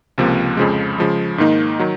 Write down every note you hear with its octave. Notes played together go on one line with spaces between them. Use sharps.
C#2 C3 F3 A#3
F2 C#3 F3 G#3
C#3 F3 G#3
G#2 D#3 A#3 D#4
D#3 F#3